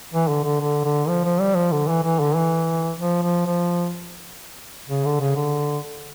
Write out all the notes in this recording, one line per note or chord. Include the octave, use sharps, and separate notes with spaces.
E3
D3
D3
D3
D3
F3
F3
G3
F3
D3
E3
E3
D3
E3
F3
F3
F3
C#3
D3
C#3
D3